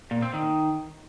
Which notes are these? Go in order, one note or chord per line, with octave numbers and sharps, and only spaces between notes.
A#2
C4
D#3